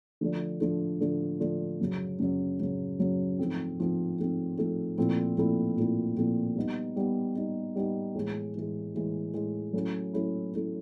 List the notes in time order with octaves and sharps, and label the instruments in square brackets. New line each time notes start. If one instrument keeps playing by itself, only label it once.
[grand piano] D3 F3 A3 D4
D3 F3 A3 D4
D3 F3 A3 D4
D3 F3 A3 D4
F#2 C#3 F#3
F#2 C#3 F#3
F#2 C#3 F#3
F#2 C#3 F#3
G#2 F3 A3 C4
G#2 F3 A3 C4
G#2 F3 A3 C4
G#2 F3 A3 C4
A#2 F3 A3 C4 E4
A#2 F3 A3 C4 E4
A#2 F3 A3 C4 E4
A#2 F3 A3 C4 E4
G3 B3 D#4
G3 B3 D#4
G3 B3 D#4
G3 B3 D#4
A2 E3 G#3
A2 E3 G#3
A2 E3 G#3
A2 E3 G#3
F#3 A3 C#4 E4
F#3 A3 C#4 E4
F#3 A3 C#4 E4